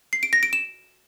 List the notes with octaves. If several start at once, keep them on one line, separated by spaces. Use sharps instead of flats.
C7
D7
A#6
D7
E7